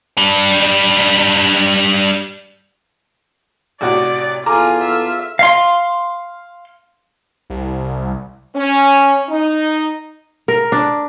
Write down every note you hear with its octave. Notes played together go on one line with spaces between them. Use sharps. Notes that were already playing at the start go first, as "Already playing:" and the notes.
G3 D4
A1 C3 F#4 D5
E2 F4 G#4 A4 G#5 A#5 D6
E5
F5 C6
C2
C#4
D#4
A#4
D4